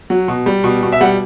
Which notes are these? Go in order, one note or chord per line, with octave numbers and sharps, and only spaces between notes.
F#3
B2
G3
B2
B2
E5
G3 F#5